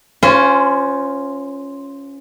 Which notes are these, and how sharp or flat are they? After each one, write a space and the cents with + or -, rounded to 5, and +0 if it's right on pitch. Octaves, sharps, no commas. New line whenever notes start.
C#4 +0 F4 +0 C5 -30